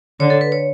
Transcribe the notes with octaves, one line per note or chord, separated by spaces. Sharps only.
D3 C#5
A4
B4
C#5